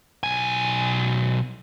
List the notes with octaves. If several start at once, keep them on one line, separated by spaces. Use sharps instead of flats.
B1 G#5